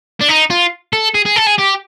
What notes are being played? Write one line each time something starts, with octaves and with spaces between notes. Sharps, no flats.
D4
D#4
F4
A4
G#4
G#4
A4
G#4
G4